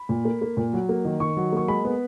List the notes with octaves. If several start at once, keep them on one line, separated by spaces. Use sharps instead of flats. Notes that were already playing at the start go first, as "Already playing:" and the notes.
Already playing: B5
A#2
A#3
A#3
A#2
F#3
A#3
D#3
D#3 C#6
F#3
A#3 C#6
G#3 B5
B3